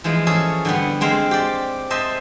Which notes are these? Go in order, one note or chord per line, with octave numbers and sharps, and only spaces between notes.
E3 F3 G#3
C#4 G#4 A4
D3 G3 B3
G#3 C4 F5
G4 D5
C5 D#5 E5 A5